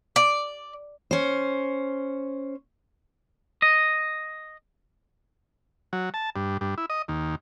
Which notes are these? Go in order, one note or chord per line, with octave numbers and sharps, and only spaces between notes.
D5
C#4 C5
D#5
F#3
A5
G2
G2
E4
D#5
D#2